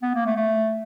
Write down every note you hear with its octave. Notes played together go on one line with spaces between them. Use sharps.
B3
A#3
A3
A3